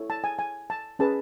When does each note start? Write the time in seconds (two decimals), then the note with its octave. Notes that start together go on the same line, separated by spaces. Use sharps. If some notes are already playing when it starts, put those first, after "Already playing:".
Already playing: E4 A4 C#5
0.10 A5
0.24 G#5
0.39 G#5
0.70 A5
0.99 C#4 G#4 B4 A5